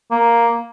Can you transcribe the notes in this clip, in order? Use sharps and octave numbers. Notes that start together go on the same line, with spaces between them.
A#3